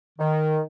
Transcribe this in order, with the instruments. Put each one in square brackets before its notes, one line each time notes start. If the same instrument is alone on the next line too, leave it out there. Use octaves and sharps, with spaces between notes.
[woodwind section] D#3